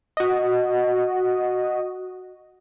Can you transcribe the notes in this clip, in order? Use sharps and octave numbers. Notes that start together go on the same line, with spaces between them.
F#4 D#5